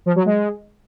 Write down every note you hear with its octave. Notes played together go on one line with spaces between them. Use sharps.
F3
F#3
G#3